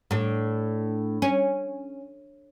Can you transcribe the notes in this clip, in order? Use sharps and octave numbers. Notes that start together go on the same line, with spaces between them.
A2 D4
C#4